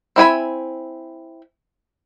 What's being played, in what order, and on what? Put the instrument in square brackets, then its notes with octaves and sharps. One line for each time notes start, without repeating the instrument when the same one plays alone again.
[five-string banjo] C4 E4 G#5 B5